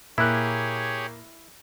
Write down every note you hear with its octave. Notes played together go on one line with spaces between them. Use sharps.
A#2 A#3 E4 G4 G#4 C#5 F#6